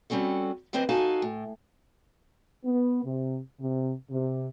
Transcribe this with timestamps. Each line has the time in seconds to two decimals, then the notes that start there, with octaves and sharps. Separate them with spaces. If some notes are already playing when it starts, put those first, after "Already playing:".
0.10 G3 C4 C#4 F#4 A4
0.73 F#2 D3 C4 B4 C5 D#5
0.89 D#4 F#4 A4 F5 G#5 A5
1.22 A2
2.65 B3
3.05 C3
3.60 C3
4.11 C3